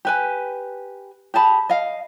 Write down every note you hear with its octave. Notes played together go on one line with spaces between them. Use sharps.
G4 B4 G#5
G4 G#4 A5 B5
D#5 F5